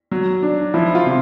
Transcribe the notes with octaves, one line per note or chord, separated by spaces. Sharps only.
F#3
D4
F3 E4
F4
C3